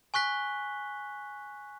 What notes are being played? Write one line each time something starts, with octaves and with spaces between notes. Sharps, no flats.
G#5 C#6 F#6 B6 G7